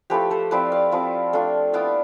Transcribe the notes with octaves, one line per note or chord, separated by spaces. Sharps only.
F3 A3 E4 G4 B4
A4 C5
F3 C4 E4 B4 D5
D5 F5
F3 C4 E4
A3 D4 F4
B3 E4 D5 F5